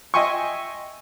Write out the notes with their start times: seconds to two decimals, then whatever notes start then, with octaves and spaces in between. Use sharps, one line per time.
0.14 D#5 E5 G5 G#5 C6 C#6